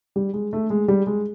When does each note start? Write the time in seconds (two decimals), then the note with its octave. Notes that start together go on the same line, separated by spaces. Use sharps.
0.16 G3
0.34 G#3
0.53 A3
0.70 G#3
0.88 G3
1.07 G#3